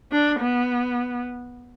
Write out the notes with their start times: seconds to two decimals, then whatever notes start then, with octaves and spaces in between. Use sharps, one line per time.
0.12 D4
0.39 B3